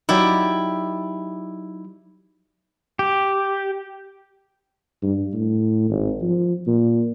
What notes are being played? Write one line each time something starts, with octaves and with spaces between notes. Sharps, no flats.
F#3 D#4 E4 G4 D5
G4
G2
A2
G#1
F3
A#2